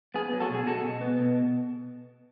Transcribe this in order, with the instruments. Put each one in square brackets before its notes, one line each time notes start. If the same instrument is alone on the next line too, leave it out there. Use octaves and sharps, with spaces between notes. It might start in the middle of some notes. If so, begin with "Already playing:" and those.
[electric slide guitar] B3 G#4
F#3
F#4 A4
B2
G#4
B2 F#4 A4
B2
B3
B2